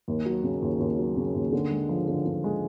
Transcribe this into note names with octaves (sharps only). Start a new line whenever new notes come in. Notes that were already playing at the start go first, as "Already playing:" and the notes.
D#2
F#3
C#3
D#2
D#2
F#3
C#3
D#2
D3
G#3
F3
D3
D3
G#3